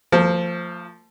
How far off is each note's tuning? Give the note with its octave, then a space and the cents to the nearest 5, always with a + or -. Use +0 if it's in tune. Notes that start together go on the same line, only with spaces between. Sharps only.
F3 +0 A3 +40